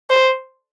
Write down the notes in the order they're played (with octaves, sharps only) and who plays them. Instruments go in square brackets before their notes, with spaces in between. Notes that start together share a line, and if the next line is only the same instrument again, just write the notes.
[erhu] C5